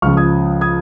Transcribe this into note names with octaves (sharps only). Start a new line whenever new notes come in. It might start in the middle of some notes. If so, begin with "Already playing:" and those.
C#2 C#3 F3 C#6 F6
D#6 G#6
D#6 G#6